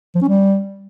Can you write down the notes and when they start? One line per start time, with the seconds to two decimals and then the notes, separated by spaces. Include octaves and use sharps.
0.15 F3
0.21 C#4
0.28 G3